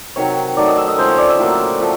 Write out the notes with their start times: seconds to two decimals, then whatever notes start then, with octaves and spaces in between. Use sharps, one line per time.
0.16 C3 D#3 F#3 C#5
0.57 D#3 F#3 A3 D5
0.68 D#5
0.77 E5
0.88 D#5
0.97 C#3 F3 G#3 C4 C5
1.08 C#5
1.18 D5
1.29 E5
1.39 A2 F#3 A#3
1.80 F3 A3